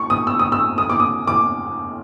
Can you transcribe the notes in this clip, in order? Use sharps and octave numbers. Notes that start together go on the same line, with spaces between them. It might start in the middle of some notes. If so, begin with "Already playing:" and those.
Already playing: C#6
D#6
E6
D#6
E6
D#6
D6
D#6
D6